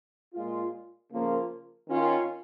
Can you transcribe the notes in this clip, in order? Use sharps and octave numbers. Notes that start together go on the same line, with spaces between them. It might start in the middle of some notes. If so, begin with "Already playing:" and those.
A#2 G#3 F4
C#3 F3 A#3 F4
D#3 C#4 F4